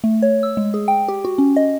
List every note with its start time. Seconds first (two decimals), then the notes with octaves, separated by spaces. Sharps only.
0.04 A3
0.22 C#5
0.43 E6
0.57 G#3
0.74 G#4
0.88 G5
1.08 G4
1.25 F#4
1.38 C#4
1.56 D#5